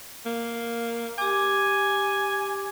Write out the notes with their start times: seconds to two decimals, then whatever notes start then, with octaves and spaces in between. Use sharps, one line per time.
0.26 A#3
1.18 G4 G#5 D6